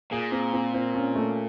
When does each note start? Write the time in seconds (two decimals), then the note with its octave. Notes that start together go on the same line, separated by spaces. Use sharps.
0.11 A#2 G#4
0.32 C4
0.53 C4
0.74 C4
0.95 C#4
1.16 A3